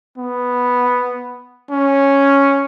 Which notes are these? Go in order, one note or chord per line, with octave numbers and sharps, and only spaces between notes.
B3
C#4